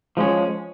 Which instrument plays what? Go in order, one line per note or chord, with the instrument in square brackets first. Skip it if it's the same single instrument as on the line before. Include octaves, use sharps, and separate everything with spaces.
[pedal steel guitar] F3 G#3 C#4